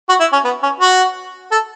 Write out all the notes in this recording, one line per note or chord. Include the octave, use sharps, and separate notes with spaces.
F#4
E4
C#4
B3
C#4
F#4
A4